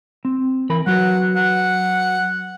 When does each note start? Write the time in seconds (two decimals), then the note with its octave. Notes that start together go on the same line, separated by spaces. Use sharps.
0.25 C4
0.69 E3 A#4 B5
0.87 F#3 F#4 B4 F#5
1.36 F#5